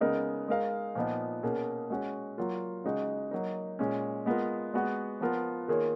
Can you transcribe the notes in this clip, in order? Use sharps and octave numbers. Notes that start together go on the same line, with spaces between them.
C#3 G#3 B3 D#4 A#4
G#3 D#4 A#4 F5
A#2 F3 B3 D#4
B2 A#3 C#4 G#4
G#3 C#4 F#4
F#3 A#3 F4
C#3 G#3 D#4 F#4
F#3 A#3 D#4
A#2 G#3 C#4
G#3 B3 F4 A#4
G#3 B3 F#4
F3 B3 F4 A#4
D#3 A#3 F4 G#4 C#5